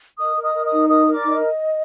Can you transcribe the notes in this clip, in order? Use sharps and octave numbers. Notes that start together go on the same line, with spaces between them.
A#4 D#5 D#6
A#4
D#5 D#6
A#4
D#5 D#6
D#4
A#4 D#5 D#6
A#4
D5 D6
D#4
D#5